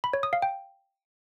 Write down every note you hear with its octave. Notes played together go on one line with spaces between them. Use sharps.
B5
C#5
D#6
F5
G5